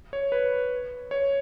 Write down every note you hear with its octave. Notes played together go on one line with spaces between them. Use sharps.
C#5
B4
C#5